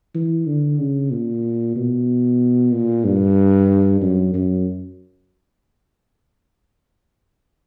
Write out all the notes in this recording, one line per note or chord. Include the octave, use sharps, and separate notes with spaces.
E3
D3
C#3
A#2
B2
A#2
G2
F#2
F#2